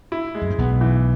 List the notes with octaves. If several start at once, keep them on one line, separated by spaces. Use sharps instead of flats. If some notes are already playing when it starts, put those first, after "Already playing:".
E4
G#3
F#2
G#2
B1 B2 B3
E3